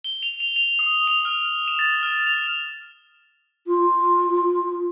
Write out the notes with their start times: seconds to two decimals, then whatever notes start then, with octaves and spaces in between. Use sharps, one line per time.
0.04 G7
0.23 F7
0.40 F7
0.56 F7
0.79 D#6
1.07 F7
1.25 F6
1.68 E7
1.79 A6
2.03 F6
2.27 F7
3.67 F4